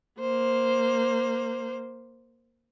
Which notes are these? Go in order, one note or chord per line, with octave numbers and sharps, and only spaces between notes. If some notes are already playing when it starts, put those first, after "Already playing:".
A#3 C5